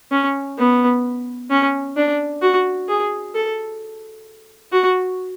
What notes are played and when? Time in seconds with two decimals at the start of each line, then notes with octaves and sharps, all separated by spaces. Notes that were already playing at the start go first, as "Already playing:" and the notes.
0.11 C#4
0.58 B3
1.50 C#4
1.97 D4
2.42 F#4
2.88 G#4
3.35 A4
4.72 F#4